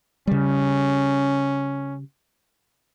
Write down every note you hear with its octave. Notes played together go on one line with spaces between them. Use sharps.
C#3 G3 C#4